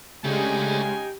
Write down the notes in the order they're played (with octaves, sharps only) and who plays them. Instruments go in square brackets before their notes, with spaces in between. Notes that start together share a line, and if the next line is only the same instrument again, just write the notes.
[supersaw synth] C#3 G#3 [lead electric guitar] A3 D4 [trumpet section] D#4 G5 G#5 [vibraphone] G4